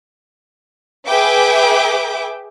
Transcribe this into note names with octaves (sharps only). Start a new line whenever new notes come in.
G#4 B4 E5 G5 D6